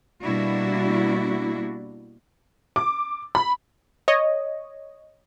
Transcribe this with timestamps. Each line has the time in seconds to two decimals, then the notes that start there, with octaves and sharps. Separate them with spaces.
0.23 B2 G3 A#3 D4 E4 F#4
2.76 D6
3.35 B5
4.08 C#5 D#5